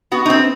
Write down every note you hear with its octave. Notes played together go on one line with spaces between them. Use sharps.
B3 F#4
D#4
C4